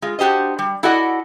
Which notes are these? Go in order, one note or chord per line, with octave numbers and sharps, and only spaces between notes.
G#3 F4
D4 F#4 G4 C5 D#5
G3
E4 F#4 A4 D5 D#5 F#5